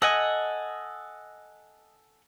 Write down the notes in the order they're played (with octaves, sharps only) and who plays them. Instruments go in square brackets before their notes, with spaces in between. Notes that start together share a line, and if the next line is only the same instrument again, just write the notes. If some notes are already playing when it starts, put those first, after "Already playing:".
[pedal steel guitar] A4 F#5 G#5 [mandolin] D#5